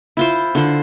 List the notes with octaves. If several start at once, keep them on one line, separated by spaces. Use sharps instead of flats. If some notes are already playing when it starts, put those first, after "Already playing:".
E4 F4 C5
D3 F4 C5